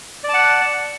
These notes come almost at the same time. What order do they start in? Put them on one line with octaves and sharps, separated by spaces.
D5 A5 F#5